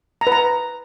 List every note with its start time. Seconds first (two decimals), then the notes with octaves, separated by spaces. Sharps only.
0.21 A#5
0.27 B4
0.32 A#5